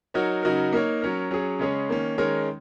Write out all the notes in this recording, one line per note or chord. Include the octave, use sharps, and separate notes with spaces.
F#3 D#4 F#4 A#4 C#5
C#3 F#3 D#4 F#4 A#4
A#3 D#4 A#4 C#5
F#3 C#4 A#4
F#3 C#4 G#4
C#3 G#3 C#4 G#4 C#5
D#3 A#3 C#4
D#3 G#3 C#4 A#4 C#5